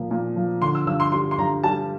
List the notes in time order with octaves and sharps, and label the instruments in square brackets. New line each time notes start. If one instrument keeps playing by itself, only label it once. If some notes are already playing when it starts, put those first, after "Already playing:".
Already playing: [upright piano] A#2 F3 A#3
A#2
F3
[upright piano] D3 [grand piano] C6
[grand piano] E6
[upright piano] G2 [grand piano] E6
[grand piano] C6
[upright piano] G3 [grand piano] C6
[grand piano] C6
[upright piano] G2 [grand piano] A#5
[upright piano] G3 [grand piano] A5